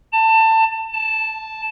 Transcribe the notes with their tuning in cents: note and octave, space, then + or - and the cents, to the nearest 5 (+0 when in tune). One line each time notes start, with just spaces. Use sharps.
A5 +20
A5 -5